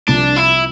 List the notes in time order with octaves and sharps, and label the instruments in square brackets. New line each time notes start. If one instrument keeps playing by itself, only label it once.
[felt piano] C2 C3 F3 A#3 F4 [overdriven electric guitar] D4
[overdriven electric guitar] E4